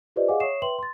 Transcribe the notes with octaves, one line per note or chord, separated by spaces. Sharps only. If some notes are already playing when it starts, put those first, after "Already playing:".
F4 G4 B4 C5 D5 D#5
G#4 D#5 F5 F#5 G#5 D6
C#5 E5 C#6 D#6 C7 E7
B4 E5 G5 C6 F#7
C6 A6